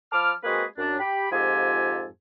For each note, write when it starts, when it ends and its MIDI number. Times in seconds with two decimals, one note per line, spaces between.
0.12 0.32 53
0.12 0.32 81
0.12 0.32 83
0.12 0.32 86
0.12 0.32 89
0.44 0.64 56
0.44 0.64 58
0.44 0.64 60
0.44 0.64 66
0.44 0.64 68
0.44 0.64 71
0.78 0.99 42
0.78 0.99 62
1.00 1.29 67
1.00 1.29 79
1.00 1.29 83
1.32 2.06 41
1.32 2.06 44
1.32 2.06 65
1.32 2.06 67
1.32 2.06 69
1.32 2.06 80